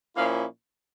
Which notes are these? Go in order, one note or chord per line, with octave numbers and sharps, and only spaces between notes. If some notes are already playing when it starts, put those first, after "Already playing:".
A#2 F3 A#3 C#4 E4 F5